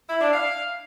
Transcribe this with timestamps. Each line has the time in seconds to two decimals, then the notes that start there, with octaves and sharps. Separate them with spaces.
0.09 E4
0.21 D4
0.33 F5